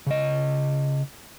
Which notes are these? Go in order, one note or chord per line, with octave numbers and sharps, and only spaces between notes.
C#3 D#5